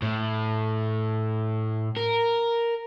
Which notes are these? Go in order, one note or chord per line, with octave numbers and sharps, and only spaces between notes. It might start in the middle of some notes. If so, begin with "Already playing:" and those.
A2
A#4